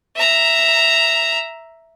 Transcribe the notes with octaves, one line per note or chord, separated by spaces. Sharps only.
E5 A#5